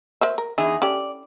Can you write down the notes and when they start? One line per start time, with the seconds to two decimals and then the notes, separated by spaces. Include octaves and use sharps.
0.21 A#4 C5 E5
0.38 A#4
0.58 E2 D#4 G#4 E5
0.82 C#4 G4 A4 D5